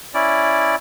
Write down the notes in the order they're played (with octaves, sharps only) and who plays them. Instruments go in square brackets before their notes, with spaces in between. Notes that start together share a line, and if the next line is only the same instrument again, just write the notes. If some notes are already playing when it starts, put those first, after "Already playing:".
[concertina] C#4 E4 D5